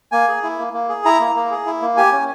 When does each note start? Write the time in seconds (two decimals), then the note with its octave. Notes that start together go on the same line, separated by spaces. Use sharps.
0.12 A#3 G#5
0.28 G#4
0.43 E4
0.59 A#3
0.73 A#3
0.89 G#4
1.05 E4 A#5
1.20 A#3
1.35 A#3
1.51 G#4
1.66 E4
1.82 A#3
1.97 G4 G#5
2.12 C#4